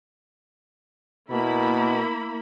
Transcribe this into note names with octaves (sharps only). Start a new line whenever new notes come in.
B2 A#3 E4 B5